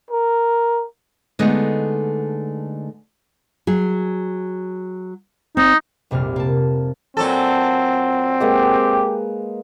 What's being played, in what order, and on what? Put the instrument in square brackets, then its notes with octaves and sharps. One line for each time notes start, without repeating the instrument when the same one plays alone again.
[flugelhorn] A#4
[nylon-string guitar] D3 G#3 A3 B3 D#4
F#3 G#4
[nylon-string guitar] C4 [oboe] D#4
[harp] F1 A#1 C3 G3 F6
A#3 A5
[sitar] A#2 F#3 A4 [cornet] C4
[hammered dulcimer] G#3 A#3 B4 [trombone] G4